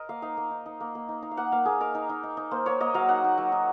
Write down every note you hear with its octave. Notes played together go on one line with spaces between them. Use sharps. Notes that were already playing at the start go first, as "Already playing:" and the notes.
Already playing: A#4 D#5
A#3 F5
D#4 F5
A#3
D#4
D#4
A#3
A#3
D#4
D#4
F5
A#3 F#5
A#3 F5
A#3 G#4
D#4 A#4
D#4
D#4
D#4
D#4
A#3 C5
A#3 C#5
A#3 D#5
F#3 F5
D#4 F#5
D#4
F#3
D#4